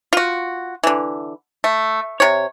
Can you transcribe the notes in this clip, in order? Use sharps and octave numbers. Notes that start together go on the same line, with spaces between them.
F4 F#4
D3 E3
A3
C3 C#5